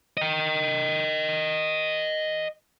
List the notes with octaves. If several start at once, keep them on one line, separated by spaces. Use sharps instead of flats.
D#5 G5